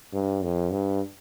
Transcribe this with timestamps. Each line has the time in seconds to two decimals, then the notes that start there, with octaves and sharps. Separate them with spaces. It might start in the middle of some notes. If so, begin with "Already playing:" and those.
0.13 G2
0.42 F2
0.71 G2